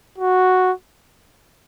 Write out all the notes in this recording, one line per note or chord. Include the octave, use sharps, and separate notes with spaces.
F#4